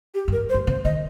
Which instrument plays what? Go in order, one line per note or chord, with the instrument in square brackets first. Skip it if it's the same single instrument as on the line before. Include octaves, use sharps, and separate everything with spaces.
[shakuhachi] G4
[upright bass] G2
[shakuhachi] A#4
C5
[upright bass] G2
[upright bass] C3 [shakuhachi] C5
[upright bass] D#3 [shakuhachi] D#5